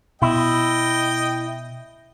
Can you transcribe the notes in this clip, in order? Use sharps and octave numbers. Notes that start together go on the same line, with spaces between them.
B2 E4 D#5 G5